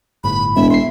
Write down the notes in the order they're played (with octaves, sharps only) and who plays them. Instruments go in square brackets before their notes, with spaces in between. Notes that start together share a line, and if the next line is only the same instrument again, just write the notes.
[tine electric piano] G1 A2 [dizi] B5
[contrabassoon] E1 [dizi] E5
[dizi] E5 [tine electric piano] C6 C7